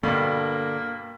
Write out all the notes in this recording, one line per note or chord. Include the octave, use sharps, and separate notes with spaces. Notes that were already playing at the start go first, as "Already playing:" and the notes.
G2 B2 D3 A#3